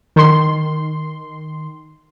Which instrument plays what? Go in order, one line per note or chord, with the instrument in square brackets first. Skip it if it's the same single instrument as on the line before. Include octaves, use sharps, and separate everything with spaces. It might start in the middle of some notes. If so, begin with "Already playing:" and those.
[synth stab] D#3 C6